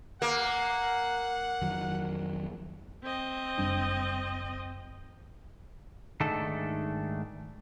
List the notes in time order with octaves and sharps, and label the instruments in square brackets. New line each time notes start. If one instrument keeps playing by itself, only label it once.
[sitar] A#3 [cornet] F#5
[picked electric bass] F2 D#3 F#3
[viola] C4 D#5
[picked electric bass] F#1 G3 D4
[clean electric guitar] G#2 D#3 G#3 A3 D4 A4